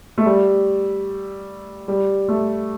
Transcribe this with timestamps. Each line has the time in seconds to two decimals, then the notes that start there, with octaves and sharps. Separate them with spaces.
0.18 A3
0.26 G3
1.88 G3
2.28 A3